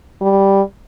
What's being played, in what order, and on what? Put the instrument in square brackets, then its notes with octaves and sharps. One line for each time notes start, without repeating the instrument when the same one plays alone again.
[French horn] G3